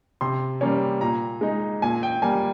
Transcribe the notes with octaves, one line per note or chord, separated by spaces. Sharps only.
C3 C6
G3 A#3 C#4
A#2 A#5
G#3 D#4
A#2 G#5
G5
G3 A#3 G#5